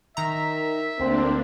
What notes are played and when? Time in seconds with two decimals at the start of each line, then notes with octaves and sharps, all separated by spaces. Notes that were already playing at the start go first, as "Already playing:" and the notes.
0.17 D#3 E5 A#5
1.00 D2 A#3 C4 D4